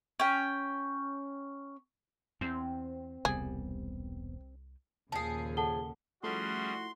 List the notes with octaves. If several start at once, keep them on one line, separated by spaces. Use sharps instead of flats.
C#4 G5
E2 C4
E1 C2 G3 B3 G#4
D#2 A#2 C#3 F3 G#4 A5 C7
A4 F#5 A5 G7
F3 G3 A3 C#4 E4 F#4 G#4 C6